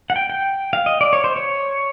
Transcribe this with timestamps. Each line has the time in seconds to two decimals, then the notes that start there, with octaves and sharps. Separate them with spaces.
0.10 F#5
0.16 G5
0.30 G5
0.73 F5
0.86 D#5
1.01 D5
1.13 C#5
1.24 C5
1.36 C#5